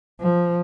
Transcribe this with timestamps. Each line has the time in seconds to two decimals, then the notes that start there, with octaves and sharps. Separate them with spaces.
0.20 F3